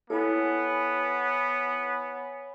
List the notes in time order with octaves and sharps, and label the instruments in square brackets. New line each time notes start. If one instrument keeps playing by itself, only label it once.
[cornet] B3 [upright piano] E4 A4 [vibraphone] C#5 G#5 B5